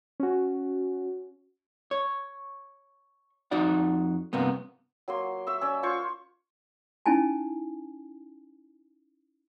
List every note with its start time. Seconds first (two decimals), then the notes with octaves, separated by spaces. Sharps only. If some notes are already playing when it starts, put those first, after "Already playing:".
0.20 C#4 F#4
1.91 C#5
3.51 F2 D#4 F#4 D5 F#5
4.33 G2 C3 A#3 B3
5.08 F#3 A#3 C6
5.47 E5 C#6 E6
5.61 C#4 D5 E5
5.83 F4 C5 C#5 C#6
7.06 C#4 D#4 E4 G#5 A5